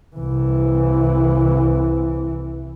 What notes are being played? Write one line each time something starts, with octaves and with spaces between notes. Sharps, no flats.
C2 E3